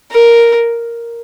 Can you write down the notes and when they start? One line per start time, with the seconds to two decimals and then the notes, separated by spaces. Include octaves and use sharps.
0.12 A#4